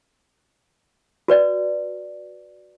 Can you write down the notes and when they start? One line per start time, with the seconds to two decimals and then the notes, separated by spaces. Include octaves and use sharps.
1.28 F#4 B4 D5